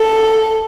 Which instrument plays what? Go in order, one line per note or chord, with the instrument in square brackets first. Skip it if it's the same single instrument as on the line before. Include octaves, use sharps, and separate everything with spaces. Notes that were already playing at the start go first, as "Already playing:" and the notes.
Already playing: [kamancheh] A4